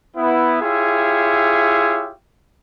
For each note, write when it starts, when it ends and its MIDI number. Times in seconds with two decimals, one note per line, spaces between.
0.17 0.59 59
0.17 0.59 64
0.62 2.12 64
0.62 2.12 65
0.62 2.12 67
0.62 2.12 68
0.62 2.12 73
0.62 2.12 76